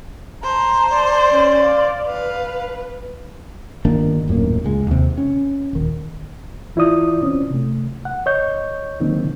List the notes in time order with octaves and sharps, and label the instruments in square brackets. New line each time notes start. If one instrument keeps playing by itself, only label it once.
[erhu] C5 [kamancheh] A5 A#5
[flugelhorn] D5
[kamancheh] C#4
F5
[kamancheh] B4 [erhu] F5
[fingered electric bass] G1 D#3 A#3 D4
D#1 F#2 A2 A#3
C#2 G#3
D#2 C3
C#4
D#1 D#3
[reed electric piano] E3 E4 F4 D5 D#6
C4 C#4
C3 A3
F#5
C#5 D#5 C#6 G6
D3 D#3 F#3 A#3 C4 D#4